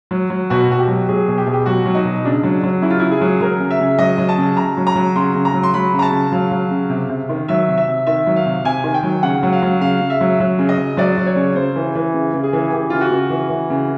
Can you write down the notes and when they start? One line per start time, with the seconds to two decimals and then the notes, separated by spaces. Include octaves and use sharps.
0.11 F#3
0.30 F#3
0.50 B2 F#4
0.69 B2 F#4
0.78 G4
0.88 F#3
1.09 F#3 G#4
1.28 B2
1.38 G4
1.46 B2 G#4
1.53 G4
1.66 F#3 F#4
1.86 F#3
1.95 D#4
2.05 B2
2.25 C#3 D4
2.43 F#3
2.63 F#3
2.82 C#3 E4
2.90 F4
2.99 C#3 E4
3.11 G#4
3.21 F#3
3.41 F#3 A#4
3.60 C#3
3.70 E5
3.80 C#3
3.98 F#3 D#5
4.18 F#3
4.29 A5
4.38 C#3
4.57 C#3 A#5
4.77 F#3
4.87 A#5
4.96 F#3
5.16 C#3 C6
5.35 C#3
5.45 A#5
5.54 F#3
5.63 C6
5.74 F#3 B5
5.94 C#3
5.99 A#5
6.02 A5
6.12 C#3
6.32 F#3 F5
6.51 F#3
6.71 C#3
6.90 C3
7.09 C3
7.29 D#3
7.48 F#3 E5
7.68 C3
7.77 E5
7.88 C3
8.07 D#3 E5
8.27 F#3
8.36 F5
8.46 C3
8.65 C3 G#5
8.84 D#3
8.94 G5
9.03 F#3
9.23 C#3 F#5
9.43 F#3
9.53 F5
9.62 F#3
9.81 C#3 F5
10.01 C#3
10.10 E5
10.21 F#3
10.40 F#3
10.59 C#3
10.69 D#5
10.78 C#3
10.97 F#3 D5
11.18 F#3
11.26 C#5
11.36 C#3
11.56 C#3 C5
11.76 E3
11.95 E3
12.14 C#3
12.33 C#3
12.43 G#4
12.53 E3
12.72 E3 G4
12.90 C#3 F4
13.01 F#4
13.11 C#3
13.30 E3
13.50 E3
13.70 C#3